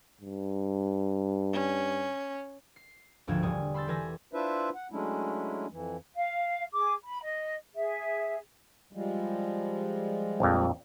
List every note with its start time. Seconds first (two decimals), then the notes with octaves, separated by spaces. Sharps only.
0.22 G2
1.53 C#4
2.76 C7
3.27 G#1 D2 F3 G#6 E7
3.42 E1 D3 G3 G#5 D#6
3.74 B5 C6 E6 G6 A6
3.87 E3 A4 B4 G#5 E6 A#6
4.34 D4 E4 F4 B4 C5 E5
4.74 F#5
4.92 F#3 G#3 A3 C#4 D4 E4
5.72 F2 E3
6.15 F5
6.73 G#4 D6
7.04 B5
7.22 D#5
7.74 G#4 E5
8.93 F3 G3 G#3
10.40 A#1 F2